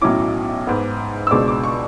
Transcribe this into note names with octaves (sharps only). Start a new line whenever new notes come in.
B1 A2 F#3 C#4 E4 D6
G#2 G#3 B3
E6
C#2 B2 G#3 D4 D6
D6
C#6